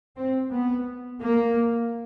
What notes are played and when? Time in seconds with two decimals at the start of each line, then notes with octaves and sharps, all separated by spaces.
0.17 C4
0.52 B3
1.23 A#3